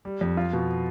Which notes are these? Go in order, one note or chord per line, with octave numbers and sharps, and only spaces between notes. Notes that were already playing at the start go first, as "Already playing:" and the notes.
G3
F2
F4
B2